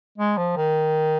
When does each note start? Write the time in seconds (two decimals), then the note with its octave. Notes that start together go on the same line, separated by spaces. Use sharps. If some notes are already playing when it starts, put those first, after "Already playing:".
0.18 G#3
0.38 F3
0.57 D#3